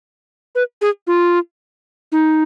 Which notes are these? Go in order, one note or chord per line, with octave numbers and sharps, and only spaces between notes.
B4
G#4
F4
D#4